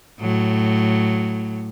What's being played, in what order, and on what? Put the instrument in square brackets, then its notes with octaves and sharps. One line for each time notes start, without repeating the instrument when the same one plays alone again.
[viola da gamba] A2 F#3